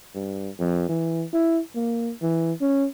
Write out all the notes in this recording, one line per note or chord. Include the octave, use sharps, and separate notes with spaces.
G2
F2
E3
E4
A#3
E3
C#4